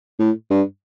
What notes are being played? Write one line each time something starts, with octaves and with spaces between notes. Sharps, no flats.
A2
G2